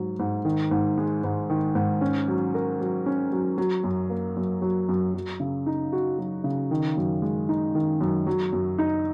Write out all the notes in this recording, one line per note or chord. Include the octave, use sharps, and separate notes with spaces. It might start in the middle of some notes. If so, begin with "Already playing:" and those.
Already playing: G#2 F#3
G#2
D#3
G#2
G#3
G#2
D#3
G#2
C#4
F#3
A#4
F#3
C#4
F#3
F#3
F#2
A#3
F#2
F#3
F#2
F#3
C#3
D#4
F#4
F#3
C#3
D#3
F#2
G#3
D#4
D#3
F#2
F#3
F#2
D#4